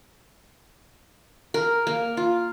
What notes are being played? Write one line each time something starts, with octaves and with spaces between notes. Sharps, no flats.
A#4
A#3
F4